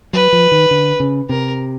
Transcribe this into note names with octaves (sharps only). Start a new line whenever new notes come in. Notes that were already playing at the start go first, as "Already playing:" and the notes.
F#3 B4
F3
D#3
D3
C#3
C3 A#4